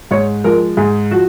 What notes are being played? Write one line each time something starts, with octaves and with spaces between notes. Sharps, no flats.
G#2 C#5
F3 G#3 A#4
G#2 G#4
F3 F#4